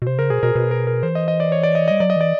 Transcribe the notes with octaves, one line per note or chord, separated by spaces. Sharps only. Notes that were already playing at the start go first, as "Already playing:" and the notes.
B2
C3 C5
C#3 A#4
B2 G#4
B2 A#4
B2 B4
A#4
A#4
E3 C5
D#5
D#5
D5
C#5
D5
D#5
G3 D#5
F#3 D5
D#5
E3 D5